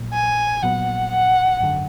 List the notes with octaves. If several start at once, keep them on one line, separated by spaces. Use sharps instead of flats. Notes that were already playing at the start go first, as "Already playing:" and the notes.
Already playing: A#1 A#2 F#3
G#5
A#1 A#2 F#3 B3 F#5
F#5
G#1 F#2 D3